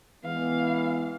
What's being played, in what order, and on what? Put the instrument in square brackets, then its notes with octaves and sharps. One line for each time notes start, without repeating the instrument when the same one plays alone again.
[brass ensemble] E3 G#3 B3 [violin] F5